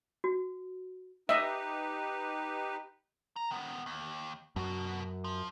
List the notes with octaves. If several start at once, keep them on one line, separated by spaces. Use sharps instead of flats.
F#4
D#4 G4 B4 D#5 E5
A#5
D#3 B3
D#2
F#2 B2 F#4
F3